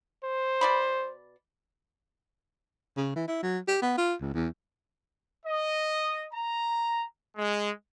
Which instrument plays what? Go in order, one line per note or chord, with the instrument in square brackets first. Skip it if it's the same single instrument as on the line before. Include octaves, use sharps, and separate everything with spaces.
[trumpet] C5
[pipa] B2 D5 B5
[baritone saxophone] C#3
E3
E4
F#3
G4
B3
F4
C#2
E2
[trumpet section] D#5
A#5
G#3